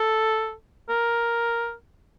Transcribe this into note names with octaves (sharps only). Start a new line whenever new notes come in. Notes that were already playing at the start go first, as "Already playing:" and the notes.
Already playing: A4
A#4